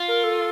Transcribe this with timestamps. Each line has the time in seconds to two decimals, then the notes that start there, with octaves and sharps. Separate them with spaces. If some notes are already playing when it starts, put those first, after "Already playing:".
Already playing: F4
0.08 A#4
0.24 A4